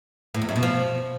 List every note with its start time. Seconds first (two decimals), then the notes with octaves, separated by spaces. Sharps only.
0.34 A2
0.42 E2
0.49 F#2
0.56 B2
0.63 F3